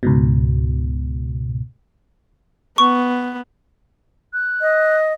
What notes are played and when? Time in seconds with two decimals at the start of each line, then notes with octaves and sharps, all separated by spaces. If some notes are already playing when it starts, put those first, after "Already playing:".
0.03 C#2 G#2 B2
2.78 B3 C#6
4.33 F#6
4.61 D#5